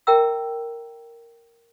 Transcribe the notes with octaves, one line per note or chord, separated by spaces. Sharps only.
A#4 E5 G5 A#5 E6